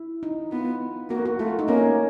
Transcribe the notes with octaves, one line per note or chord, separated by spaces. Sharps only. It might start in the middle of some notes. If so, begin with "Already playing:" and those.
Already playing: E4
D#4
B3 F4
A#3 F#4
F#4
A3 F4
D#4
A#3 C#4